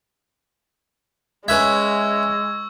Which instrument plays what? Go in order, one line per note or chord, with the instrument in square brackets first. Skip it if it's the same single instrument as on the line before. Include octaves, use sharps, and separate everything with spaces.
[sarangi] G#3 [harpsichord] C#4 B4 E5 [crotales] C#6 E6 G#6